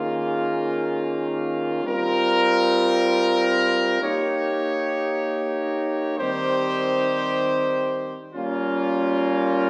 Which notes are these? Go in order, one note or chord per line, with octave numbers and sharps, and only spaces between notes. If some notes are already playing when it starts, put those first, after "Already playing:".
Already playing: D#3 A#3 C#4 F4 G#4
G3 C4 F4 A#4
A#3 D#4 G4 C#5
D#3 G3 C4 G4 C5
G3 A#3 C#4 F4